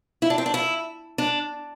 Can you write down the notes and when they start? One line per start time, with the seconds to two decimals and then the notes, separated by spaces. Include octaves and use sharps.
0.22 E4
0.30 D4
0.38 C4
0.46 D4
0.54 E4
1.18 D4